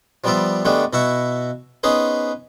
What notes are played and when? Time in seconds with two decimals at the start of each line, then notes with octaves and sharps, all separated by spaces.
0.24 F3 G3 B3 F4 D5 E5
0.65 D3 G#3 A3 B3 D4 G4
0.93 B2 E4 F#4 E5 C#6
1.83 B3 C#4 D#4 G#4 B4 C5